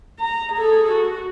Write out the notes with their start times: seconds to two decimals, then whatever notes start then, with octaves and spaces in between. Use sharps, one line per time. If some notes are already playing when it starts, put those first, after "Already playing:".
0.20 A#5
0.53 G#4 A4
0.92 F#4